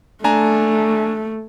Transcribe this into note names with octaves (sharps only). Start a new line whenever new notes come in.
A3 D4 G#5 A#5